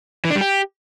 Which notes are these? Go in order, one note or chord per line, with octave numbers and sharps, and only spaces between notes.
E3
D4
G3
G4